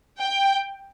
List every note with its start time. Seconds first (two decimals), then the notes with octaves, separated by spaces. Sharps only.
0.19 G5